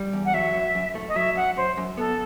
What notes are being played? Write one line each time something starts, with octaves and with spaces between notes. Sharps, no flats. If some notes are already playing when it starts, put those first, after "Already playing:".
Already playing: G3
E2
F#5
F#3 E5
F#2
F#2
A3
D#5
F#3 E5
F#2 F#5
F#2 C5
F#2
B3 A4